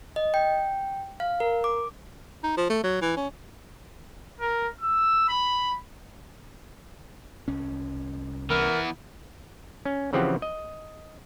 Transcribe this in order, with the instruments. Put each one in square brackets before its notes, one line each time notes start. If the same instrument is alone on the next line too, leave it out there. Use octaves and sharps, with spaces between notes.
[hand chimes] D#5
G5
F5
A#4
D6
[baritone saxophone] D#4
F3
A3
F#3
E3
C#4
[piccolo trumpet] A#4
E6
B5
[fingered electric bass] C2 C#4
[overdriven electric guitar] E3 B3 [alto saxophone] A#4
[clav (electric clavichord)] C#4
C#3 E3 F3 C4 G4 F#5
D#5